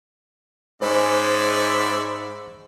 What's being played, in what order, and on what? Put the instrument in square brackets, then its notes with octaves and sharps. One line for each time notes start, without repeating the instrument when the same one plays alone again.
[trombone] G#2 [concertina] G#3 B5 [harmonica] C#4 D5 E5 [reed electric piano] C5